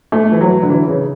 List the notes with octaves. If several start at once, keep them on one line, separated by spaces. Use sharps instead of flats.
A3
E3
F#3
D3
E3
C#3